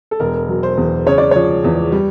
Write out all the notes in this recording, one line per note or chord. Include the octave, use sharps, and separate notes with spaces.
A4
E1 A#4
F#3
C5
E2
C#3 C#5
D5
F3 C#5
E2
G3